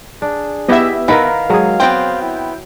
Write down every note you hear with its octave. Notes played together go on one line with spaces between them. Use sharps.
D4 G#4
B3 E4 G4 D#5 E5
D#3 A#4 B4 F5 F#5 B5
F#3 G#3 G#4
B3 C4 C5 G5
E4